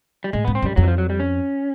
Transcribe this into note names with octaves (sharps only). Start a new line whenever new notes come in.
G3
A2 G#3
G#2 B3
C4
F#2 G3
F2 F#3
E3
F3
F#3
G3
C#4